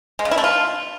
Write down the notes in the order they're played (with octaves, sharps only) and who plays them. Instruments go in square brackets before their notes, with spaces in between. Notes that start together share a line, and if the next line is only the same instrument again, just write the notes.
[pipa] G#3
C#3
E4
A3
F4